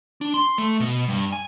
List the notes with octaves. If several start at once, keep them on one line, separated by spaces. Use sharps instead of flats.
D4
C6
A3
B2
G2
G#5